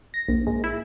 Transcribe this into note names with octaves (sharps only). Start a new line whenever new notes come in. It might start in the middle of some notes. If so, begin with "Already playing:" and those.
A#6
A#1
G#2
E4